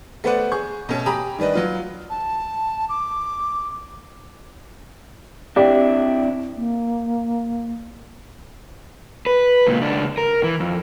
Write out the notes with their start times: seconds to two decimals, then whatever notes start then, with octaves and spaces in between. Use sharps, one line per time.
0.24 A3 B3 B4 C5 D5 F#5
0.52 G#4 C#6 G6
0.89 B2 A3 C#4 A4
1.06 G4 G#5 A#5 B5 D6 D#6
1.39 D#3 G3 D4 B4 D#5
1.54 F#3 F4 B4
2.10 A5
2.89 D6
5.56 C4 D4 E4 G4 D5
6.56 A#3
9.26 B4
9.66 C#2 A#2
9.81 C#2 D4
10.18 A#4
10.43 E3
10.60 F2